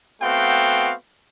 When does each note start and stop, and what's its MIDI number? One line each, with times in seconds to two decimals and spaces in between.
0.22 0.93 57
0.22 0.93 59
0.22 0.93 60
0.22 0.93 66
0.22 0.93 77
0.22 0.93 79